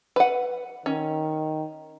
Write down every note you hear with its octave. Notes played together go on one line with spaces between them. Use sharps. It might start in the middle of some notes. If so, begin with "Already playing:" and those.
B4 F#5
D#3 C#4